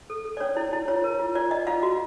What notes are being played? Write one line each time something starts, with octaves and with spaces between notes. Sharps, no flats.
A4
A4
D5
C#4 C#5
E4
E4
F4 C#5
A#4
F4
F4 D5
F4 D#5
F4 F5
F#4